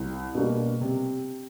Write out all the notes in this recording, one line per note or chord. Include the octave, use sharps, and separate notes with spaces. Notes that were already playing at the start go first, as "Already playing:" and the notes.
Already playing: C2
B2 G3 A#3 D4
C3